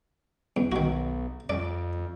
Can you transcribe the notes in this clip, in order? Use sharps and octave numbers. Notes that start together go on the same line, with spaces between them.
E2
B1 D#3 F#4
F2 D5